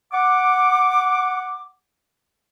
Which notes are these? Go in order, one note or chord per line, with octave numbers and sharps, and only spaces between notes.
F#5 D6